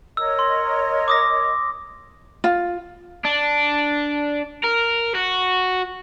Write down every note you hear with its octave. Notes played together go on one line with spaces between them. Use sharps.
A#4 C#5 D#5 E6
C6
D6 D#6 A#6
F4
D4
A#4
F#4